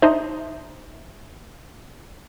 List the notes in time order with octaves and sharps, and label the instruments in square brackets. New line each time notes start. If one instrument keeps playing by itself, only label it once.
[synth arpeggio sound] D4 D#4 C5 [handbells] E5